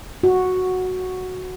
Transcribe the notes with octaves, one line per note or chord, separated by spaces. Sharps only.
F#4